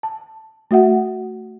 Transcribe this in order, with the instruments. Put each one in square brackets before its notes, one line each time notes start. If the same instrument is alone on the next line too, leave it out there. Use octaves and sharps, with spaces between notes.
[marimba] A5
A3 F#4 E5 F#5